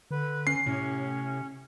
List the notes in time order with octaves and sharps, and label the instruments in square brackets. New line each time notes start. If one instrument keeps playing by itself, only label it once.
[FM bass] D3 [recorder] B4
[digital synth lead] C#4 [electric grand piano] C7
[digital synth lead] A2 [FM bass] C3 [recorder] C#4